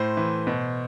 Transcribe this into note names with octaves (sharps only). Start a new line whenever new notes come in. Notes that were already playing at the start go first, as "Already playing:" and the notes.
Already playing: A2 C5 C6
E3
B2